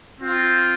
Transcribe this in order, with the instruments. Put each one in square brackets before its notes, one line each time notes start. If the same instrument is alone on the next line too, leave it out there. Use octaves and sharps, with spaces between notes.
[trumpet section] C4 F4